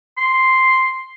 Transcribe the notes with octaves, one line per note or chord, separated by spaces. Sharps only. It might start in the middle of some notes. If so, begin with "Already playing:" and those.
C6